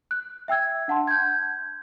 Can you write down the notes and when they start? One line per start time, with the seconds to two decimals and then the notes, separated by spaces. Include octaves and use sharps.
0.11 F#6
0.48 E5 G5 E6 G#6
0.88 D4 F#5 A5 C6
1.07 G6 G#6